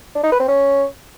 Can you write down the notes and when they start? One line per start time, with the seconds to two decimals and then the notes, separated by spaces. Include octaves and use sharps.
0.15 D4
0.23 D#4
0.32 B4
0.40 C4
0.48 C#4